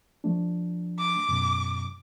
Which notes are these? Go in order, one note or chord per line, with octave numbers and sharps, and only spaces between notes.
F3 A3 D4
D6
F#2 B2